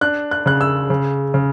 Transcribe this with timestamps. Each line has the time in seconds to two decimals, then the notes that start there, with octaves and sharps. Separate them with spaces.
0.01 D4 F#6
0.31 F#6
0.46 C#3 F#6
0.61 E6
0.90 C#3
1.34 C#3